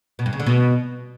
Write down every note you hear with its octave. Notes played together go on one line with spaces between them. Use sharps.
B2
G2
C#3
D3
B2